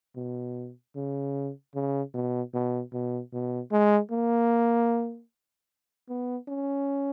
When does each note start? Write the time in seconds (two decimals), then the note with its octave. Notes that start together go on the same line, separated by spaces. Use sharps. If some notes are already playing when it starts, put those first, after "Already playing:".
0.16 B2
0.96 C#3
1.75 C#3
2.14 B2
2.54 B2
2.93 B2
3.33 B2
3.72 G#3
4.11 A#3
6.09 B3
6.48 C#4